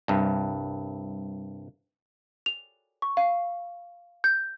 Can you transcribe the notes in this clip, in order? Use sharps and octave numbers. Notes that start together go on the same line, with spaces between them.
C2 G2
F7
C#6
F5
G6